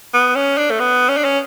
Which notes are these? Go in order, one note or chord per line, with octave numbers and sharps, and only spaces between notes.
B3
C#4
D4
A3
B3
C#4
D4
C#4